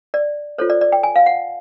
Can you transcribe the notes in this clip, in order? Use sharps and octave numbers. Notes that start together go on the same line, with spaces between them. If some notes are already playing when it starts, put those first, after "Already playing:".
D5
F4 A4 C5 C#5
D5
D5
G5
G#5
F5
F#5